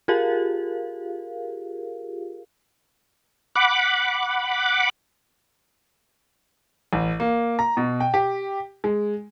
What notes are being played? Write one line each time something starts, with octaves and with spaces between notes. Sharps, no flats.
F4 G4 G#4 A#4 F5
F#5 B5 D6
A1
A#3
A#5
B2
G5
G4
G#3